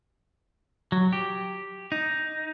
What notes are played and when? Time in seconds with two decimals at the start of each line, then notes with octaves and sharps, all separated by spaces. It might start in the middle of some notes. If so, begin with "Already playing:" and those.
0.92 F#3
1.13 G4
1.92 D#4